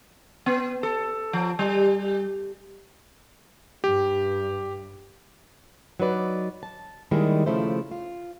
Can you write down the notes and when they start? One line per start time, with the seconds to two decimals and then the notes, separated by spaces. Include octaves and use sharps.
0.46 B3
0.83 A4
1.33 F3
1.59 G3
3.84 G2 G4
6.00 F#3 D#4 B4 D5
6.63 A5
7.11 D#2 D#3 G3 G#3 E4
7.46 D#2 C#3 F3 A3 E4 C5
7.91 F4